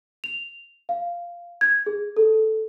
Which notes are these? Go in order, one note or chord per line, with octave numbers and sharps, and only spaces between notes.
F7
F5
G#6
G#4
A4